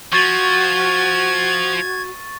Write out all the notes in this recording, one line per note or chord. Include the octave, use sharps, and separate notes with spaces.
F3 F#4 C#6 G#6 A6